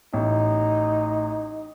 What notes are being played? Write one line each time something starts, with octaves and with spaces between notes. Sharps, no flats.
A1 D#4